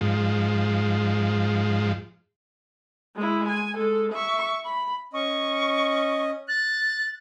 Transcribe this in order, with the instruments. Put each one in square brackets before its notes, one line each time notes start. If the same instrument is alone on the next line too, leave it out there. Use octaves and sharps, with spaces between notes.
[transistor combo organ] G#2 F3
[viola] G#3 E4
G#5
G#3 A4
E5 C#6
B5
[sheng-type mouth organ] C#4 D#5 [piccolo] C#6
[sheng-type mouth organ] F#6 [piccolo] A6